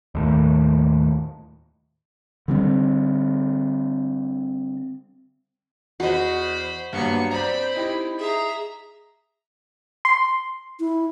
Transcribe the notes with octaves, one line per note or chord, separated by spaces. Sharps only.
D#2 A2
D3 G3 C4
E2 F#4 C5 D#5 B5
G2 F#3 A#3 B3 C#6
C4 C5 D5 A#5 B5
D#4 E4 G4
G#4 E5 A#5
C6
E4